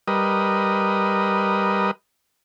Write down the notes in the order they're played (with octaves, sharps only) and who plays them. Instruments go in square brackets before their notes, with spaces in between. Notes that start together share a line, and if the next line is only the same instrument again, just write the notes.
[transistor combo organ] G3 A#4 B4 D#5